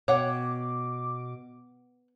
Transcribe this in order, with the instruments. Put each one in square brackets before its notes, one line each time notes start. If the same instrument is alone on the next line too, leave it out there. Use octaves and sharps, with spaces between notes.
[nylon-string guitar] B2 [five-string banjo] C#5 F#5 G5 [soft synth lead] D6